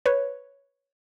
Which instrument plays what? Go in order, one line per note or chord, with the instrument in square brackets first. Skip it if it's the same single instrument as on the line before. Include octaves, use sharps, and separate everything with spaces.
[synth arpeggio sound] B4 C#5